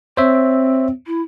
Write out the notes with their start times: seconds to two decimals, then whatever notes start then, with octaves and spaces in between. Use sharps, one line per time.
0.17 C4 C5 C#5 E5
1.07 E4